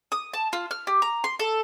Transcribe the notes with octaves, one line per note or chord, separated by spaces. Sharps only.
D#6
A5
F4
F6
G4
A#5
C6
A4